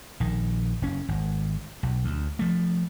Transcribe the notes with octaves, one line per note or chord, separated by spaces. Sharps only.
A#1 D#3
F#1 C#4
G#1
B1
D2
F3 A3